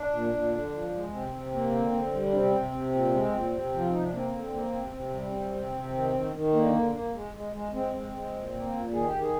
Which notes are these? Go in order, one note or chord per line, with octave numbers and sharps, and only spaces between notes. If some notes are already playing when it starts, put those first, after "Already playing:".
Already playing: D4
A#2
A#2
D3
F3
G#3
C3 C4
C3
A#3
D3
D3
G3
D4
C3 C4
C3
C3
A#2
G#3
A#2
C3
F3
F4
C3 D#4
D4
A#3 C4
D3
A#3
C3
C3
G3
C3
C3
C3
D#3
D#3
D#3
D3 A#3
D3
A#3
G#3
G#3
G#3
G#3 C4
G#3
G#3
A#2
A#3
A#2
D#3 G#4
G4
D#3
G#4